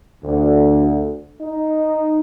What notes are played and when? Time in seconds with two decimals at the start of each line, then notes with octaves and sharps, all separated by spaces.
0.24 D2
1.41 D#4